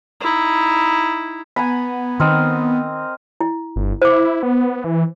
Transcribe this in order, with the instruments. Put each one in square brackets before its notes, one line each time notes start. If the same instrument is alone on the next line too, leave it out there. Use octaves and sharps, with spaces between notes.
[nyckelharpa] D#4 E4
[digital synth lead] B3 [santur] G#5 A#5 B5
[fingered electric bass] D#3 [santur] C4 A#4 D#5
[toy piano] E4
[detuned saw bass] G1
[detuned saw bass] E4 [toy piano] C5 D6
[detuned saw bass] B3
E3